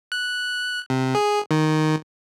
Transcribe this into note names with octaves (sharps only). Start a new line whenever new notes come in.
F#6
C3
G#4
D#3